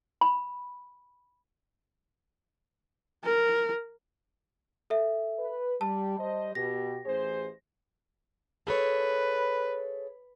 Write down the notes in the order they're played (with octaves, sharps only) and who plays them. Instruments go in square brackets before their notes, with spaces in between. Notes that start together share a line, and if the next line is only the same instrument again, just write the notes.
[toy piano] B5
[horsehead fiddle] A#4
[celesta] A4 E5
[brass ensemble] B4
[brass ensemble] G3 [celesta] A5
[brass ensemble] G3 C5 D#5
[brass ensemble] B2 G4 [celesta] A#6
[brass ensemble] A1 G#4 C5
[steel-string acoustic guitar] G#4 A4 C#5 [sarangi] B4